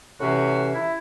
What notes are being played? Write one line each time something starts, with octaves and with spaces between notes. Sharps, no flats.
A2 C3 E3 C#4 F#4
E4